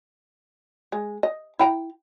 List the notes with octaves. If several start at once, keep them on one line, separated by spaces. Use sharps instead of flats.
G#3
D#5
E4 G5 A#5